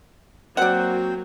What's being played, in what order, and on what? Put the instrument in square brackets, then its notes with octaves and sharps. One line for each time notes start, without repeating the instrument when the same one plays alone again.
[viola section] F#3 A#3 [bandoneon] C4 C5 [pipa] D5 F#5